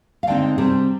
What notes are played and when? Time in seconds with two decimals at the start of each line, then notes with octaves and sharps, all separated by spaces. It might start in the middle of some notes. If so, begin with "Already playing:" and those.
0.23 F5
0.27 D3 G#3 C4 D#4 G5
0.58 C3 G3 C4 G#4